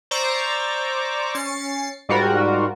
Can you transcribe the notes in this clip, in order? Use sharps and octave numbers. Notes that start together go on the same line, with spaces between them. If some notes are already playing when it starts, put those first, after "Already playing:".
C5 D5 A#5 C#6 D6 E6
C#4 A6 C7 C#7
G#2 G3 F4 F#4 A#4